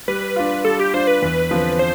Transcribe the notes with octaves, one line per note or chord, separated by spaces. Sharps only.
G3 B4
D4 F4
G3 A4
G4
D4 F4 C5
B4
E2 B4
D3 F3 C4 F4
C5